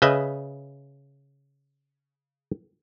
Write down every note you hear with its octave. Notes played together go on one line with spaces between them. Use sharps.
C#3 B4 D#5 E5